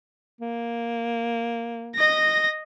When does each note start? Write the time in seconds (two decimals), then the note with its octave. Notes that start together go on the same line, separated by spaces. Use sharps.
0.41 A#3
1.95 D#5 A#6